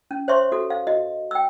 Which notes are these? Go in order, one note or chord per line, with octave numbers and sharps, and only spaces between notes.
C#4
C5 C#5 E5 C6 C#6
F#4 A4
F5
F#4 D#5
G5 E6